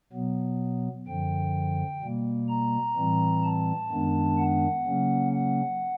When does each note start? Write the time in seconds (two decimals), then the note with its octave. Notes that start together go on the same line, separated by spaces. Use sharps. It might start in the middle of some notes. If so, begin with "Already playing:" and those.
0.13 B2 F#3 B3
1.07 F#2 D3 F3 G5
2.02 B2 G3 A#3
2.49 A#5
2.96 A2 E3 G3 C4
3.43 A5
3.91 F#2 D#3 G#3 B3 D4
4.38 F#5
4.86 C#3 F#3 A#3 C#4
5.32 F#5